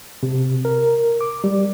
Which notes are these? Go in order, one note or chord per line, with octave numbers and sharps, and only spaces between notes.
C3
A#4
D6
G3